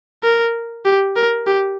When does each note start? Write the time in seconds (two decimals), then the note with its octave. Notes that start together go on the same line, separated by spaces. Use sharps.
0.23 A#4
0.85 G4
1.16 A#4
1.47 G4